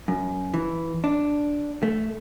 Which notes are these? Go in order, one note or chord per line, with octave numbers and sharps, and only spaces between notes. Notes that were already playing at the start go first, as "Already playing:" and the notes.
F#2
E3
D4
A3